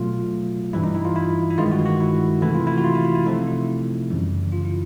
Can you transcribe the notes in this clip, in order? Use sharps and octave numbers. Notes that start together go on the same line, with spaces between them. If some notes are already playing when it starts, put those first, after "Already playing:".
Already playing: B2 F#3 A3 F4
G2 E3 G3 E4
D#4
E4
F4
E4
E4
G2 D#3 G#3 F4
F#4
F#4
E4
C3 E3 A3 E4
F4
E4
F#4
F4
E4
F4
E4
C3 F3 A3 D#4
E4
F#2 C#3 E3 G3
F4
E4